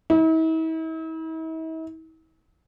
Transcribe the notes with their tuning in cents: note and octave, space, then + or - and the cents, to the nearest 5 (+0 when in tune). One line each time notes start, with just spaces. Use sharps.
E4 -45